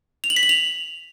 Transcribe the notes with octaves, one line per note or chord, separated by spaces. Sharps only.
F7
F#7
B6
F#7
F7